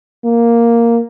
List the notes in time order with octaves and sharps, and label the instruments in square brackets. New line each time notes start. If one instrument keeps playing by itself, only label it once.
[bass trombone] A#3